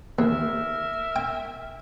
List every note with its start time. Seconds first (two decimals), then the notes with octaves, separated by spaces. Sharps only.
0.19 D#2 A#4 E5
1.16 G5